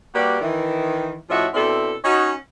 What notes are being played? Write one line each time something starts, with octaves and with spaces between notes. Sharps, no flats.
G3 A#3 F#4 G4 B4 D5
D#3 E3
A2 F3 C#4 F#4 D#5 E5
B2 C4 D4 E4 A4
C#4 D#4 F#4